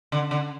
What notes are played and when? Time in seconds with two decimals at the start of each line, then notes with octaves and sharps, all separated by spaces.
0.12 D3
0.31 D3